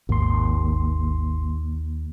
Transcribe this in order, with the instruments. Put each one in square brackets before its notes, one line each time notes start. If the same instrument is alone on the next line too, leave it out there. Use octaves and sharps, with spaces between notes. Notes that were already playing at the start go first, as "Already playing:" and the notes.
[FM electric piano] G#1 C6 [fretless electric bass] D#2